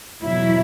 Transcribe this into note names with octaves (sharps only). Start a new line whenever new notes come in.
E2 B2 F#3 E4